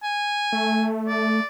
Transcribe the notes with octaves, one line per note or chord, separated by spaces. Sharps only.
G#5
A3
D5